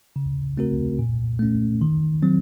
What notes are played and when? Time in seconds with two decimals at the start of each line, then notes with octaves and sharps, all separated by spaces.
0.16 C#3
0.57 A3 C4 F#4 A#4
0.99 A#2
1.39 A3 C#4
1.81 D#3
2.22 F#3 C4